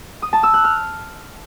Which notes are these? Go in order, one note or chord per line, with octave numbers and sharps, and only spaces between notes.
D#6
A5
E6
F#6
F6